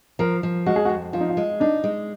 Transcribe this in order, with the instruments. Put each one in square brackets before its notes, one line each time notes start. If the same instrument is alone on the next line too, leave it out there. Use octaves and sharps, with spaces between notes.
[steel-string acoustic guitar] F3 [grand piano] A#4
[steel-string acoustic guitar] F3
[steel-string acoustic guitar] G#3 [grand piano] F#4
[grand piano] G#4
F#4
[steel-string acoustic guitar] F2
[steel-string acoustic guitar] F3 [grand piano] F4
[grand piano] D#4
F4
[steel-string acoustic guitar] G#3
[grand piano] D4 [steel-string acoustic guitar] D#4
[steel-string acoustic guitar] G#3